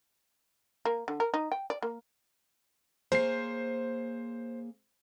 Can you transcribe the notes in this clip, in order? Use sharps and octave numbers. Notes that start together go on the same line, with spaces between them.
A#3
D3
A#4
D#4
G5
D5
A#3
A#3 G#4 C5 C#5 C7